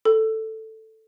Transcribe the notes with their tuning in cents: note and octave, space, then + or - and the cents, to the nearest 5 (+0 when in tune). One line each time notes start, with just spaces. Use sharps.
A4 +5